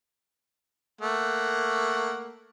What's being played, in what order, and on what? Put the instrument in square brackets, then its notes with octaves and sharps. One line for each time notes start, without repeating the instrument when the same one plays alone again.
[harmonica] A3 A#3 F#5